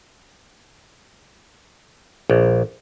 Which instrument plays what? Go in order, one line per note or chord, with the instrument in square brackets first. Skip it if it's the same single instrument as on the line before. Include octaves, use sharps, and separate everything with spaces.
[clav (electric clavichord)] A#1